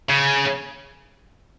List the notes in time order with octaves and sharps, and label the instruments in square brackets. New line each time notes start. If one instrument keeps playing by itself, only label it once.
[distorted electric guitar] C#3